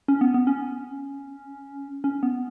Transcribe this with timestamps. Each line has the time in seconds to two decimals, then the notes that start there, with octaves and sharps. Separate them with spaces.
0.08 C#4
0.21 B3
0.34 B3
0.47 C#4
2.04 C#4
2.23 B3